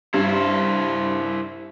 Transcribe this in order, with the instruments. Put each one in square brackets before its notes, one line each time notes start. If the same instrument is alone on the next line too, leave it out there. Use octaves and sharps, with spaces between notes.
[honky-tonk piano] G2 [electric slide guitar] E4 C5